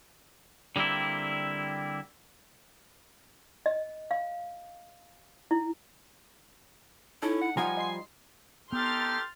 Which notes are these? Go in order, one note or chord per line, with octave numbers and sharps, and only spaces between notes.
D3 G3 A#3 C4 E4
D#5
F5
E4
C#4 D#4 E4 A4
F#5
F3 G3 D#4 F#5 G#5 A#5 C6 G#6
D#5 C6 C7
B3 D#4 G4 A4 G5 C6 F6 A6